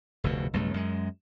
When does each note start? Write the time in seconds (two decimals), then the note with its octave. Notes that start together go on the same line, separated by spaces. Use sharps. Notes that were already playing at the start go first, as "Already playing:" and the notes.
0.24 F1 D2 B2
0.53 B1 G2 C#3 A3
0.74 F#2 G#3